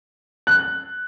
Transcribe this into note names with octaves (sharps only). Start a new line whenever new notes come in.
F#6